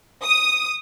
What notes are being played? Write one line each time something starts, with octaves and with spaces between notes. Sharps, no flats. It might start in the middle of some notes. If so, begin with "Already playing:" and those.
D#6